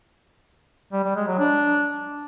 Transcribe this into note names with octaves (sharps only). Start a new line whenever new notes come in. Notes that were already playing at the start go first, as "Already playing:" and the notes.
G3
G3
G#3
F#3
D4